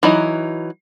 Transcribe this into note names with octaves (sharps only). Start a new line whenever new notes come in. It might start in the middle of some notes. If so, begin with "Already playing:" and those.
E3 F#3 D#4